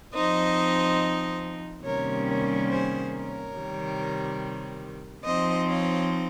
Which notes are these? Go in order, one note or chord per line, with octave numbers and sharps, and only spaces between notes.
F3 C4 D#4 C5 D#5
C3 D#3 G3 A#3 C#4 A#4 C#5
A#4 C#5
G#4 C5
A#4 C#5
C3 D#3 G3
F3 C4 D#4 C5 D#5
C#5 F5